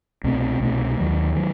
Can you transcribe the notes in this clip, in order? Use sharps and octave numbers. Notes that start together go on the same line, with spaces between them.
C2 B2 A3 C4
C2 B2 A3 C4
D#2 D#3 F#3
D#3 F#3